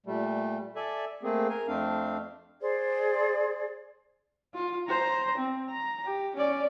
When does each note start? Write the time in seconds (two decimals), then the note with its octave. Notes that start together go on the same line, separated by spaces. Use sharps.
0.06 A#2 G3 A3
0.76 A4 D5 E5 G#5
1.23 A3 A#3 C4 G#4
1.49 A#4 G#5
1.68 F2 A3 C4 D4 F5
2.62 G#4 C5 D5
4.54 F4
4.88 C5 A#5
5.37 C4
5.70 A#5
6.05 G4
6.36 C#4 D5